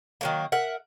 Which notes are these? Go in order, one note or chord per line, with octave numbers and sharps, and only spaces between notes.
D#3 F#3 A#3
A#4 E5 F#5